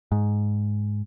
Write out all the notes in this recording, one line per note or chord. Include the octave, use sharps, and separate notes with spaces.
G#2